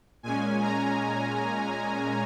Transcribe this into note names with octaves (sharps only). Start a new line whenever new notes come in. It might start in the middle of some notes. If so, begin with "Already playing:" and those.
A#2 G#3 C#4 G#5
A#5